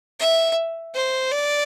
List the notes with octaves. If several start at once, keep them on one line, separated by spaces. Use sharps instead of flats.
E5
C5
D5